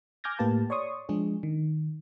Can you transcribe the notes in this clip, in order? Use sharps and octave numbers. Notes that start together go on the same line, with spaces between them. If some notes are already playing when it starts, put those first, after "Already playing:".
G#5 D6 F6 G6 G#6 A#6
A2 A#3 G4 B4 F5 A5
C#5 D5 C6 C#6 D#6
F3 G#3 D4 G#4
D#3